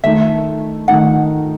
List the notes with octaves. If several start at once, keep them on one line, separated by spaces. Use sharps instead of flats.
D#3 A3 D#4 E5
D#3 A3 D#4 F#5